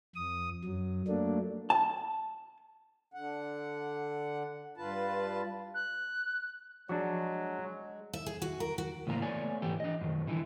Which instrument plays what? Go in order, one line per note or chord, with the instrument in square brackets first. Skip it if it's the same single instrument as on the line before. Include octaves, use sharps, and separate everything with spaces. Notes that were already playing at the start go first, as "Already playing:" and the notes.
[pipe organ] F2 D#6
F#2 F#3
F#3 A3 A#3 D4
[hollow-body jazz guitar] A5
[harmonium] D3 F#5
G2 F4 B4 A5
[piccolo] F#6
[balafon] F3 [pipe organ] F#3 [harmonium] G#3 [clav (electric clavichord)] D4 F#4
[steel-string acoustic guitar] E5
G#4
F#4
A#4
F#4
[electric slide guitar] A2 C#3 E3 A#3 G#5 A#5
A3 B3 C#5 D5 G#5
G#2 E3 G4
D4 D#5
F#2 D#3
D3 E3 E4